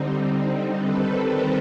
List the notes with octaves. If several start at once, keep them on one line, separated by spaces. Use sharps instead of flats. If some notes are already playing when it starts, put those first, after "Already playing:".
Already playing: D3 G3 C4 D#4
D#3 G3 C4 A4 B4
A#4 C5